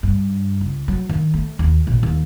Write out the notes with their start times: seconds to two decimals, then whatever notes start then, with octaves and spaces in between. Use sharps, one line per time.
0.03 G2
0.61 C#2
0.88 F#3
1.09 D#3
1.34 A3
1.59 D#2
1.87 A#1
2.03 D#2